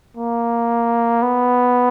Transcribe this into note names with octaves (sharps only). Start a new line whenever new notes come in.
A#3
B3